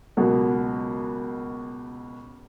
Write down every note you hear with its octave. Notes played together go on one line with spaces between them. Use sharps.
C#2 B2 F#3 A#3